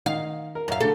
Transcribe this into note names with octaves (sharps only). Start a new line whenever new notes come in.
D#3 F5
A#4
F#2 E5 F5 A#5
D3 A3 A4